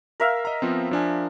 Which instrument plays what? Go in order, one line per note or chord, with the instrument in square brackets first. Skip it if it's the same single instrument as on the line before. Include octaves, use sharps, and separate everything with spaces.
[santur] A#4 E5 F5
[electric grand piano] D#5 A#5
F3 B3 C4
F3 D4 G#5